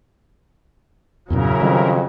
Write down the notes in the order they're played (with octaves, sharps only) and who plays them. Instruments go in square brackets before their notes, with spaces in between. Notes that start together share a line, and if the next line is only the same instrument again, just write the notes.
[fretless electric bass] E2 G2 A#2 [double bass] C#3 F#3 [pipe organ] C#4 E4 A#4
[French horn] F2 [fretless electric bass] D#3 G3